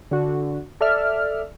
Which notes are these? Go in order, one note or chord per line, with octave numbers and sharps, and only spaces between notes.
D3 F#4
A4 D5 E5 F6